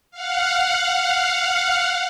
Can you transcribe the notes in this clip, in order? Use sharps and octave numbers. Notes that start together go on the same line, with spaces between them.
F5 F#5